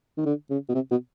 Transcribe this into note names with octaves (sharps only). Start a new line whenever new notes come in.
D#3
D3
C#3
B2
C3
B2